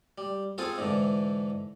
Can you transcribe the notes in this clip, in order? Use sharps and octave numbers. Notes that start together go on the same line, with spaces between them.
G3
C4 F4 G#4 A4
G#2 D3 E3